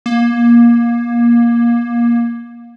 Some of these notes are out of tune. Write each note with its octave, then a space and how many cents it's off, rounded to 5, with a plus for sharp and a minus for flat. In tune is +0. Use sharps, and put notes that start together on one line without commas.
A#3 +25